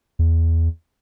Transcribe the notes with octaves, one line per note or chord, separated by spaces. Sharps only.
E2